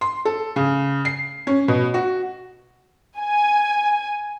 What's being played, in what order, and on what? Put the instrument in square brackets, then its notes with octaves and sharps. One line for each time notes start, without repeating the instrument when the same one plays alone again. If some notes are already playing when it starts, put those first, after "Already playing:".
[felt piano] C6
A4
C#3
C7
C#4
B2
F#4
[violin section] G#5